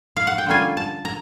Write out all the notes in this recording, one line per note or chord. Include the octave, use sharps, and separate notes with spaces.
F5
F#5
G5
D3 G3 A#3 C#4 F4 G#5
A5
A#5